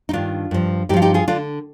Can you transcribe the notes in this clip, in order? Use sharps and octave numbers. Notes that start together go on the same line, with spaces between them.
D#4
G2 D#3 D4 F4
G2 F3
G2 F3 D#4 F4 G4
D#4 G4
F4 G#4
D3 D4 F4